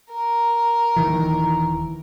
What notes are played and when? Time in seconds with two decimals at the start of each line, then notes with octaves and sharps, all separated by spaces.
0.12 A#4
0.96 D#1 D#3 E3